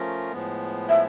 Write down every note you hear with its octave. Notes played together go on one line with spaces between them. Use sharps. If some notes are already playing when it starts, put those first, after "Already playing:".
Already playing: F3 A3 C#4 F4 A#4
A2 F3 G#3 B3
E5